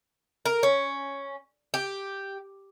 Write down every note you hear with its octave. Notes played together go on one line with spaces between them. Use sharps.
A#4
C#4
G4